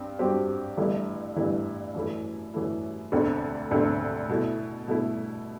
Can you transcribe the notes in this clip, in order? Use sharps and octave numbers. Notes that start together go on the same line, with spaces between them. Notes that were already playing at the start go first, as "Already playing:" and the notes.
Already playing: G2 C4
G2 F#3 C4 G4 C5
G1 G2 E3 A3 E4
G1 G2 E3 A3 E4
F#2 E3 A3 E4
F#2 E3 A3 E4
E1 D2 D3 A3 C4
E1 D2 D3 A3 C4
B2 A3 E4
B2 A3 E4